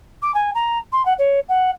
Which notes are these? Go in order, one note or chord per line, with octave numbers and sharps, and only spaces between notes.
D6
G#5
A#5
C6
F#5
C#5
F#5